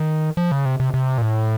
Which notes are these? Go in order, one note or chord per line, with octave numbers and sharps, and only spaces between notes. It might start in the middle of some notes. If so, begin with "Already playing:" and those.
Already playing: D#3
F3
C#3
C3
C3
C3
A#2
A2